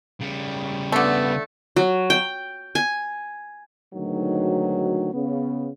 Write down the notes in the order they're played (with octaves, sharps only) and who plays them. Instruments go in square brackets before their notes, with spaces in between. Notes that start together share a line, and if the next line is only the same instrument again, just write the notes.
[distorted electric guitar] C#3 G3
[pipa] D3 A3 [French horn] B3
[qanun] F#3
G5
G#5
[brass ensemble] D2 G#2 B2 D#3 F#3
C#3 B3